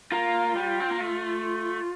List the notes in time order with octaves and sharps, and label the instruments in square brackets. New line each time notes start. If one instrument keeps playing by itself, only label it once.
[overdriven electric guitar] A#3 [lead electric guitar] F4
[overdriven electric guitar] G3
C4
A#3
A3